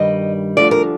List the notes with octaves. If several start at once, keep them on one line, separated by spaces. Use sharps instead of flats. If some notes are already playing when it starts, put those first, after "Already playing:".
Already playing: G2 D#3 G3 D#5
D2 D3 F3 D5
A#4